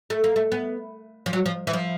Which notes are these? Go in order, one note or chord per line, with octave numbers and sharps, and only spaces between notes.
A3
A#3
A3
B3
F3
F#3
F3
E3
F3